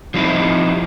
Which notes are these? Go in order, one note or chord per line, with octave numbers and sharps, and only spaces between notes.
F3 G3 C4 D#4 E4